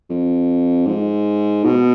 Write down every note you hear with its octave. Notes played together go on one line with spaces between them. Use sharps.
F2
G#2
B2